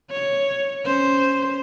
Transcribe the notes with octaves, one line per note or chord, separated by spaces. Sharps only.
C#5
C#4 C5